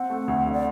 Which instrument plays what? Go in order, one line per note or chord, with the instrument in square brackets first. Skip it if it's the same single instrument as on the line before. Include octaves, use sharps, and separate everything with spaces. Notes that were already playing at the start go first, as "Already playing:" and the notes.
Already playing: [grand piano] C4 [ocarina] F#5
[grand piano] A3
D2
D3
[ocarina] D5